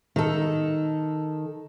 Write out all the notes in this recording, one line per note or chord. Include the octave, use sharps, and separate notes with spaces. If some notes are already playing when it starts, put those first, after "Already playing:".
D#3 A4